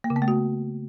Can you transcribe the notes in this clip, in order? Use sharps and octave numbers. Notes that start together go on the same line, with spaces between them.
A#3
C#3
B3
A3
F#4